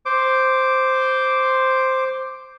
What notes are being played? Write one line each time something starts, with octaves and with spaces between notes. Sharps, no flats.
C5 D6